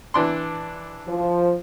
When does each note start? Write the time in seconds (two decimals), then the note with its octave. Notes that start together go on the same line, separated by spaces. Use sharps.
0.14 E3 D4 C6
1.08 F3